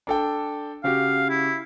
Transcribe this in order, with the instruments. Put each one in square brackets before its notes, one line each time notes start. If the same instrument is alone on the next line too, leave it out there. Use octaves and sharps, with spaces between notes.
[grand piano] D4 A4 G5
[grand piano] C#3 F#4 G4 [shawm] F5
[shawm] E4